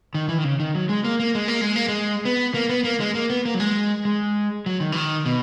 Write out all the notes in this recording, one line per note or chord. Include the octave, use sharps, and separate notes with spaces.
D#3
E3
D#3
C#3
D#3
F#3
G#3
A#3
A#3
G#3
A#3
G#3
A#3
G#3
B3
A#3
B3
A#3
G#3
A#3
B3
A#3
F#3
G#3
G#3
F#3
D#3
E3
D#3
B2